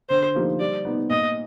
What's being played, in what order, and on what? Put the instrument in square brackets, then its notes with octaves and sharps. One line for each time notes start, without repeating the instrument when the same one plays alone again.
[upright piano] D3 [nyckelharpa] C5
[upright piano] F3 A#3 D#4 G4
[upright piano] G3 [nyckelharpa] D5
[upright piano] B3 D#4
[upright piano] A#2 [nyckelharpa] D#5